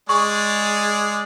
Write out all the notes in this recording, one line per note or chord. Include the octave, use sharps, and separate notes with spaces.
G#3 G#4 D5 C#6